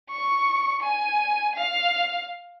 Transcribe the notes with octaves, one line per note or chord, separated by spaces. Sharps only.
C#6
G#5
F5